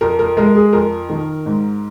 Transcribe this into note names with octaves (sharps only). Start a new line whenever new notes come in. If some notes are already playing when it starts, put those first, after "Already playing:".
F2 A#4
A#4
G#3 A#4
G#4
F2 A#4
D#3
G#2